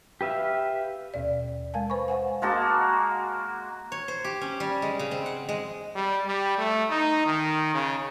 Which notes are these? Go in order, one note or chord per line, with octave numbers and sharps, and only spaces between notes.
G4 B4 E5 F5
D#2 B2 D5
G#3 A#4 F5 G#5 A5
B4 C5 G#5 B5 C#6
C5 F5 F#5 G#5
G#3 A#3 F#4 A5
C#5
C5
G4
C#4
G3
G#3
C#3
C4
F#5
G#3
G3
G3
A3
D#4
D#3
C#3